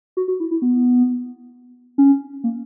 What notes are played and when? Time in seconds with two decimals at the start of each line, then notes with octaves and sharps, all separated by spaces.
0.17 F#4
0.28 F#4
0.40 E4
0.51 E4
0.62 B3
1.98 C#4
2.44 A#3